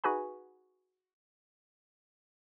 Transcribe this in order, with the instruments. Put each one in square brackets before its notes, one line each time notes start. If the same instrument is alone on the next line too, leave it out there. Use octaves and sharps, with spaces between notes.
[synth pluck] D#4 F#4 G#4 B4 G#5 B5